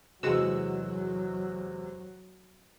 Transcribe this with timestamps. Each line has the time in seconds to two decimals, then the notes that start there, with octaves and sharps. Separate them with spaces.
0.23 E2 C3 F#3 G#3 F#4 E6